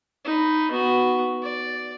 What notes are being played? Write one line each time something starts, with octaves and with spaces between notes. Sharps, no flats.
D#4 B5
B3 F#4
D5